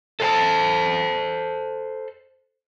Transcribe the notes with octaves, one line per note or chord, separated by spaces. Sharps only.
A4 C5 G#5 A5